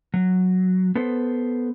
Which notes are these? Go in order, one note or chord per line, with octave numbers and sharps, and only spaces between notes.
F#3
B3 A4 C5